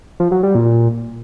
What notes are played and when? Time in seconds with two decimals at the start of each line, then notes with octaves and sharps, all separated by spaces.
0.20 F3
0.32 F#3
0.43 G3
0.55 A#2